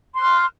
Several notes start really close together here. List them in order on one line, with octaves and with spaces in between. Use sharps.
C6 F#6 F6